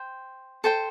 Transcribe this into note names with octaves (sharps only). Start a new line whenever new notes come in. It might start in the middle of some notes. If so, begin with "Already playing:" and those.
Already playing: C5 G5
A4 C5 G5